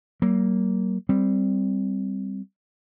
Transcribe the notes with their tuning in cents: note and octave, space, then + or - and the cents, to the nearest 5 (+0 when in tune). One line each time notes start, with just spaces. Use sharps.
F#3 +45 A#3 +0
G3 +0 C4 +0